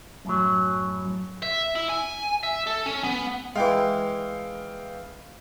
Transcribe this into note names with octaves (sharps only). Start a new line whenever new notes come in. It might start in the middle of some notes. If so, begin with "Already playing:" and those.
F#2 A2 F#3
E5
E4
G#5
E5
A4
C#4
B3
E3 G#3 F5 G5